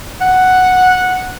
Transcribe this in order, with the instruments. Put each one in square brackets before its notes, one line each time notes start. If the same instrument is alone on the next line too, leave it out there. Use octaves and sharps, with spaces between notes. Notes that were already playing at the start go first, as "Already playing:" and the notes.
[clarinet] F#5